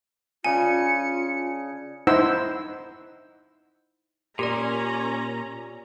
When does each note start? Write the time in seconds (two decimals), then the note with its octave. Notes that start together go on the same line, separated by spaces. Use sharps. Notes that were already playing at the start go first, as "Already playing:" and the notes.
0.44 C#3 D4 F4 G#4 G#5 C#7
2.07 D#4 E4 C5 F#5 E6
4.39 A#2 C#4 G4 A#4 D5 A#5